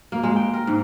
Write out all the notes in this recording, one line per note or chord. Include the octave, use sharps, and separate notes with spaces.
A#3
G#3
G5
A#4
G#2